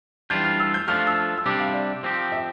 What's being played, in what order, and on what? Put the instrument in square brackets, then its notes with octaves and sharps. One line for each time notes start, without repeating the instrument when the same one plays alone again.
[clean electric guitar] E3 G3 D4 F4 [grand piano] G6
[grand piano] F6
E6
G6
[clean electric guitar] F3 A3 D4 F4 [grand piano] F6
[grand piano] E6
E6
[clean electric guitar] C3 G3 D4 G4 [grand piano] D6
[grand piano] F5
D5
[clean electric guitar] F3 C4 G4
[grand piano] E5